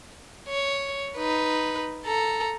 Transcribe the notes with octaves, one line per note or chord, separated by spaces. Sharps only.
C#5
D#4 B4
A4 A#5